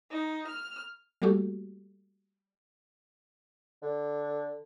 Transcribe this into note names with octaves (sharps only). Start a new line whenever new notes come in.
D#4
F6
G3 A3 A#3 F#4 G4 A4
D3